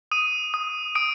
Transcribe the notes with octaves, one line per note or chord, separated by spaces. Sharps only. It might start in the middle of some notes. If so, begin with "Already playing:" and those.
D#6 D#7
D#6
D#6 D7